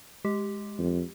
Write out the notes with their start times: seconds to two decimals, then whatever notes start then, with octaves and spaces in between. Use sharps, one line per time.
0.25 G#3 G4
0.79 F2